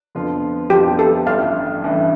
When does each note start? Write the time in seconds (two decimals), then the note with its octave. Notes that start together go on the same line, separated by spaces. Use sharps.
0.15 F2 D3 F3 B3 F4
0.70 F2 D3 F3 B3 F4 G4
0.99 A4
1.27 A1 G2 E3 A3 F5
1.82 A1 G2 E3 A3